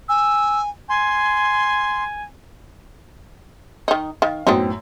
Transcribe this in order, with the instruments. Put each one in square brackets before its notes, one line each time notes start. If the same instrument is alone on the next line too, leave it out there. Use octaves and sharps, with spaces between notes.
[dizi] G#5 [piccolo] E6
[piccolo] G#5 [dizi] C6
[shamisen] D#3 D#4
[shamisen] D#3 [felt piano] F5
[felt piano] F#2 A2 [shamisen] B3 C4 D#4